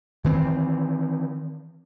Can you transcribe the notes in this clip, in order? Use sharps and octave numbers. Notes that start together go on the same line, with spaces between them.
D#3 E3 C4